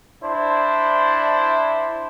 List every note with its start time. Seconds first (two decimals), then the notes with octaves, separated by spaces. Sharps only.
0.22 D4 E4 C5